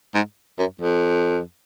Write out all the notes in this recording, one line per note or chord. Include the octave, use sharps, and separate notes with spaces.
G#2
F#2
F2